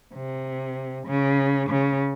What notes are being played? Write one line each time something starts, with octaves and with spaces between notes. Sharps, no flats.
C3
C#3
C#3